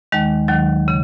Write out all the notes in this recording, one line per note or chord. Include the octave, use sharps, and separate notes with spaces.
D#2 D#3 G#3
D#2 D#3 F#3
C#3